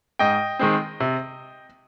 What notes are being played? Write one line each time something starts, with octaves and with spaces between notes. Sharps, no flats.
G#2 D#5 G5
D#3 G#3 C4
C3